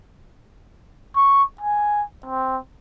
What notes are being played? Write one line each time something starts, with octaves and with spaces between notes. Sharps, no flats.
C#6
G#5
C4